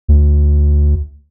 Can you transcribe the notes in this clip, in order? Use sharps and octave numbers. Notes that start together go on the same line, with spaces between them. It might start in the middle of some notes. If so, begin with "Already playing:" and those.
D2